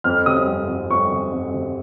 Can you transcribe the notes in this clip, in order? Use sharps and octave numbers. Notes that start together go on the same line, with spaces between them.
F2 F6
C3 D#6
F2
F2
F2 C#6
C3
F2
C3